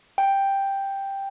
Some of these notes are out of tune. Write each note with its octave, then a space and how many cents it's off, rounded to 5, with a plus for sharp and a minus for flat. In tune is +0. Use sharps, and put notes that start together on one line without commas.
G5 +5